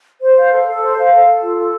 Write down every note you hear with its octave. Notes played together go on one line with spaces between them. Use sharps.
C5
F5
A4
A4
C5
F5
A4
A4
F4
A4